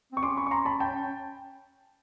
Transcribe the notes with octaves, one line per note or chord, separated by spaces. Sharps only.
C4 C#6
C#4 C6 D6
B5 C#6
C#6
A#5 C6
A5 B5
G5 A5